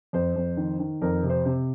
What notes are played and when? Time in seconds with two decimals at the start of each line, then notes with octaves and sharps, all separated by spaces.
0.13 F2 C5
0.36 F2
0.57 D#3
0.79 D#3
1.02 F2 A#4
1.23 C3
1.30 C5
1.45 C3